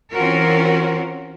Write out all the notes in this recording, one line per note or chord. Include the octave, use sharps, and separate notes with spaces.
E3 C4 C#4 F4 F#4 A#4